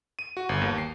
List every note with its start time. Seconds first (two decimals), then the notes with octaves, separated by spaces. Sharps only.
0.19 D#7
0.37 F#4
0.49 G1
0.61 D#2
0.78 C7